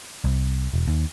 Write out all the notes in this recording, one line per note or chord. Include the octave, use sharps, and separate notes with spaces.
C2
E1
D#2